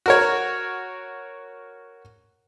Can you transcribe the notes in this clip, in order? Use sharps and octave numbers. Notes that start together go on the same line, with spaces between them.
F#4 A#4 C#5